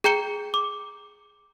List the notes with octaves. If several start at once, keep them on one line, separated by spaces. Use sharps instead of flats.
G#4 G5 A#5 G6 C#7 G7
D6